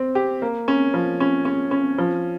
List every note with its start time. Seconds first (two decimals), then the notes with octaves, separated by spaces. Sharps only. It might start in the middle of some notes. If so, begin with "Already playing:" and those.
Already playing: C4
0.15 G4
0.42 A#3
0.68 C#4
0.94 F3
1.20 C#4
1.45 C#4
1.71 C#4
1.98 F3